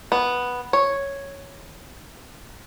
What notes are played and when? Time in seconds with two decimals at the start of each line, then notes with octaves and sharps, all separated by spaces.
0.12 B3
0.73 C#5